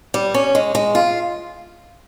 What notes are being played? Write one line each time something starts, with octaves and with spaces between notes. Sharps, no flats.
G3
C#4
G#3
G#3
F4